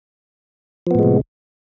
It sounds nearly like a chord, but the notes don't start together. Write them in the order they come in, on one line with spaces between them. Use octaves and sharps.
F3 B3 A2 G#3 C3